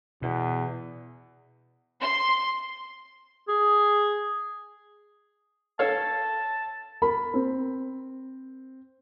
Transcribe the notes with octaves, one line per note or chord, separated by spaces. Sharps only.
E2 B2
C6
G#4
A4 C#5 F5 A5
A#4 B5
C4